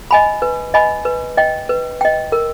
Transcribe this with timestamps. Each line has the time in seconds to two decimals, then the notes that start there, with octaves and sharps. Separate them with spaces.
0.11 D#5 G#5 B5
0.42 B4
0.74 D#5 G#5 B5
1.05 B4
1.37 D#5 G5
1.69 B4
2.01 D#5 G5
2.32 A#4